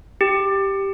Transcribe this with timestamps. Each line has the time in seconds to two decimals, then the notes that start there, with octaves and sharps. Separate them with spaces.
0.21 G4